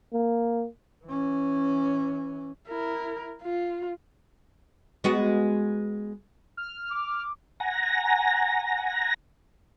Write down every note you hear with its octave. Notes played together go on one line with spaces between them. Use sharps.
A#3
E3 C#4
E4 A#4
F4
G#3 B3 F#4
F6
D6
F#5 G#5 A#5 A#6